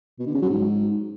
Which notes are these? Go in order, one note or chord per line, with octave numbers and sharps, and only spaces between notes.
B2
D3
C#3
F#3
G#2